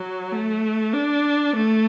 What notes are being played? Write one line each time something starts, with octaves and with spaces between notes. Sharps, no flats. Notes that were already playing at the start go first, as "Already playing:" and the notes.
Already playing: F#3
A3
D4
A3